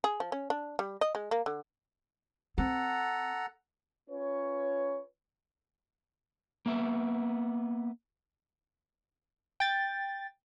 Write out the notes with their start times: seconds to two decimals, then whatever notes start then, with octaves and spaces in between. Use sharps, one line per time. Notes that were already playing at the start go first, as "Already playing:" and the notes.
0.04 G#4
0.20 F3
0.32 C#4
0.50 D4
0.79 G3
1.01 D#5
1.15 G#3
1.31 A#3
1.46 D3
2.58 C4 A4 F#5 A#5
4.09 C#4 F4 B4 C#5
6.66 A#3 B3 E5
9.60 G5 A6